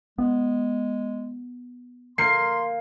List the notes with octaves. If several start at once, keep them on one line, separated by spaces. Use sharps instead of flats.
G#3 B3
A#3 C6 C7